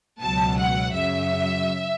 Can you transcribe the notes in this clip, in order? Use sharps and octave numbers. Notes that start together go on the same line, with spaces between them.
C#2 B2 F#3 A5
F#5
F#2 C#3 F#3 E5